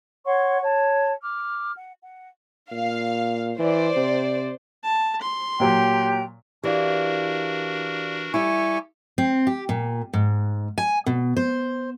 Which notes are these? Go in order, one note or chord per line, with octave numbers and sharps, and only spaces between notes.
C#5 F#5 C6 C#6
C#5 A5
D6 F6
F#5
F#5
A#2 F5
E3 C5 D5
C3
A5
C6
A#2 F#3 G4 G5 A#5
E3 D4 F#4 G4 A#4 D5 F5
G3 E4 G4 A4 G#5 C#6
C4
G4
A#2
G#2
G#5
B2
C5